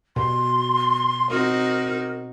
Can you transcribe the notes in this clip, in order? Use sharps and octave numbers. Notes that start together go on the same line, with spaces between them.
B2 C6
C4 D#4 F#4 A#4